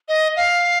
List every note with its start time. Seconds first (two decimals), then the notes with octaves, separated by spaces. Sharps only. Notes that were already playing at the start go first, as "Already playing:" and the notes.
0.08 D#5
0.36 F5